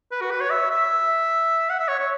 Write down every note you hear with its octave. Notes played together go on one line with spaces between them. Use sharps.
B4
F#4
B4
C#5
E5
E5
F#5
E5
C#5
C#5